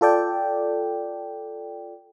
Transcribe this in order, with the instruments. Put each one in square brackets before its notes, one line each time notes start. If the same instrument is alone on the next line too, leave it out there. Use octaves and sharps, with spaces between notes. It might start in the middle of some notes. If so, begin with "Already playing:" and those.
[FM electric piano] F4 A4 D5 G5